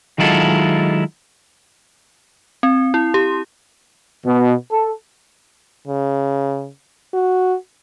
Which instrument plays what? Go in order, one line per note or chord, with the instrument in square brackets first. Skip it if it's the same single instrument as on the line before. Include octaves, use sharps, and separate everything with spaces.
[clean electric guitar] D#3 F#3 G#3 E4 F4 A4
[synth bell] C4
E4
G4
[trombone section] B2
A4
[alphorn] C#3
F#4